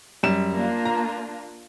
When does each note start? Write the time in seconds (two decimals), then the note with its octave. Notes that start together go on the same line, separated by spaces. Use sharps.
0.23 F#2 G3 E7
0.55 A#3 D4 F4
0.85 A#5